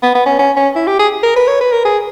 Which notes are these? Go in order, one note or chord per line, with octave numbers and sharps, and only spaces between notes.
B3
B3
C#4
C#4
C#4
E4
G4
G#4
A#4
B4
C#5
B4
A#4
G#4